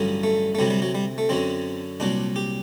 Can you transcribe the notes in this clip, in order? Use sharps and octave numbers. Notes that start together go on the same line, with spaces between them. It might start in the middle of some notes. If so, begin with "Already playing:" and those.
Already playing: A1 G2 D3 F#3
A3
A3
D2 C3 F#3 G3
G3
F#3
G3
A3
F#2 D3 F#3 C4
C2 A#2 F#3 D4
G4